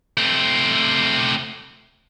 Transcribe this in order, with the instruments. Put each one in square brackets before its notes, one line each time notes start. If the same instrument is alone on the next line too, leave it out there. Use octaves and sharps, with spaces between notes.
[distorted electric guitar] A3 C4